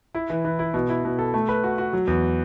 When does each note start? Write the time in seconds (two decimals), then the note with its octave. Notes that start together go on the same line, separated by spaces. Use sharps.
0.15 E4
0.30 E3
0.45 E3
0.59 E4
0.74 B2
0.89 E4
1.05 B2
1.19 A4
1.34 A3
1.49 B4
1.64 F#4
1.78 F#4
1.93 F#3
2.07 E2